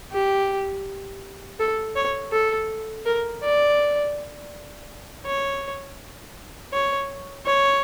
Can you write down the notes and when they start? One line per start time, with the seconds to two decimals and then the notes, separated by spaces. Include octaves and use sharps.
0.12 G4
1.59 A4
1.96 C#5
2.32 A4
3.05 A#4
3.43 D5
5.25 C#5
6.73 C#5
7.46 C#5